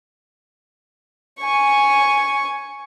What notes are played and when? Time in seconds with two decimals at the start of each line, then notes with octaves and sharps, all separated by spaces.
1.41 G#5 C#6